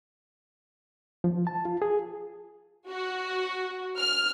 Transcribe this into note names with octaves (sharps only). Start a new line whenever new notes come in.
F3
A5
F4
G#4
F#4
F6